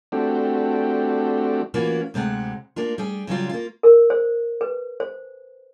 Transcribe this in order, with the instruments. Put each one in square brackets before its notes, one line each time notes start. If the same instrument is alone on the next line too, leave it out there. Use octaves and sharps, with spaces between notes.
[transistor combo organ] A3 C4 D4 F#4 G4
[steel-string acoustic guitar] E3 A#3 C#4 F4 F#4
D2 C3 G#3 F#5
A#3 D4 F4
G3 G#4
C#3 F#3 G3 F4
A#3 F4
[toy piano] A#4
C5
B4
C5